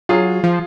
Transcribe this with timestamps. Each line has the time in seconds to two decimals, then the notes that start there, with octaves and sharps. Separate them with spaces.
0.09 F#3 F4 G#4
0.44 F3